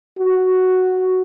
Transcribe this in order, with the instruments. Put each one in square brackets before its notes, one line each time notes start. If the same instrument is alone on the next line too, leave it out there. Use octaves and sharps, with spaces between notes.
[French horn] F#4